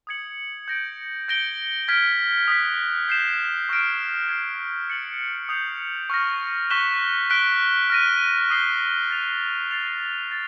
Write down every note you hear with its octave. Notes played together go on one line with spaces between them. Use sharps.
D#6 G#6 C#7 F#7
G6 A#6 D7
G6 A#6 D7 G7
F6 G#6 B6 D7 G7
D#6 F#6 B6
G6 C7 E7
C#6 F6 A#6 D7
G#6 C7 E7
A6 C#7 F#7
D#6 G6 C7 F7
C#6 F6 A#6
C#6 F#6 B6 E7 G7
F#6 B6 D7 G7
F6 A#6 D#7
D#6 G6 C7 D#7 G7
A6 C7 F7
A6 C7 F7
A6